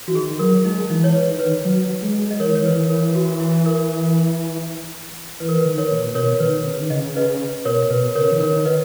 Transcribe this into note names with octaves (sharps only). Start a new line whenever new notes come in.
E3 F#4
D#3 G#4
F#3 A#4
G#3 D#4
E3 D#4
C#5
B4
D#3
B4
F#3
G#3
D#5
E3 A#4 C#5
D#3 C#5
E3 B4
A#4
F#4
E4
A#4
E3 B4
A#4
B4
D#3
A#4 C#5
A#2
B2 A#4 C#5
D#3 B4
C#3
D#3
C#3 D#5
B4 D#5
B2 A#4 C#5
B2 B4
C#3 A#4 C#5
E3
D#3 A#4 C#5
B4 D#5